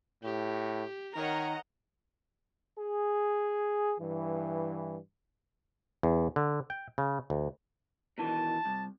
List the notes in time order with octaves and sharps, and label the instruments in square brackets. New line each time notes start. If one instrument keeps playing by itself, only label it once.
[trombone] A2 [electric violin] G4
[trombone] D#3 [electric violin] A#4 C#5 [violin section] D#5 F#5 A#5
[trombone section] G#4
G2 E3
[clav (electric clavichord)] E2
D3
G5
C#3
D2
[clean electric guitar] B2 D#3 E3 [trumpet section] A5
[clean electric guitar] C2